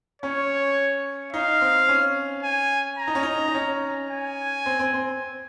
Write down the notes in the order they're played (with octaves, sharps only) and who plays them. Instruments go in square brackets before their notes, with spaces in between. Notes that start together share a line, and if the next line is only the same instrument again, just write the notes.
[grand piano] C#4 [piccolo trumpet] C#5
[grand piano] D#4 [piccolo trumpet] F5
[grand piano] C4
C#4
[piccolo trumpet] G#5
A#5
[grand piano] D#4
C#4
D#4
D#4
C#4
[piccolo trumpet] G#5
[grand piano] C4
C4
C4